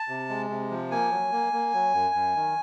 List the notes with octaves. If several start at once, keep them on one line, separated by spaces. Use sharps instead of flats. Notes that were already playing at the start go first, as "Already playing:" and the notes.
Already playing: A5
C3
G#3
C3
F3
A#3 G#5
F#3
A#3
A#3
F#3
F#2
F#2
D#3